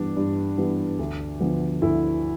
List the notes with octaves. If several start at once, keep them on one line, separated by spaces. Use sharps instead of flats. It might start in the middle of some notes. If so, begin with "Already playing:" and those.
Already playing: G2 E3 G3 B3 D4
G2
E3 G3 B3
D2
D3 F3 B3
D2 E4